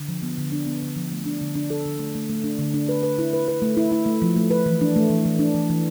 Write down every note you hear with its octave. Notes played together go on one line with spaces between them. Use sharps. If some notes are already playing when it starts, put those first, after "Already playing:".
Already playing: D3
F3
B3
D3
D4
B3
D3
F3
A3
D4
D3
D4
A4
D3
A3
A3
A3
D4
D3
D4
B4
B4
E4
B4
B4
A3
E4
E4
A3
F3
A3
B4
E3
D4
A3
E3
E3
D4
E3
E3